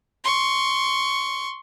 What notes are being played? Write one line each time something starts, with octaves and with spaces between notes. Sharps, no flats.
C6 C#6